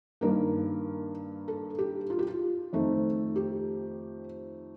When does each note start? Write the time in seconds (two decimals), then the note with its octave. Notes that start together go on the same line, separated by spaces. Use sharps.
0.21 G2 D#3 A#3 A#4
1.48 A4
1.78 G4
2.10 F4
2.19 G4
2.27 F4
2.73 F2 D#3 A3 C4
3.36 G4